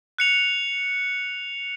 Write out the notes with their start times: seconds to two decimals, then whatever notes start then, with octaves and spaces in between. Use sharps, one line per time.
0.18 F#6 C#7 F7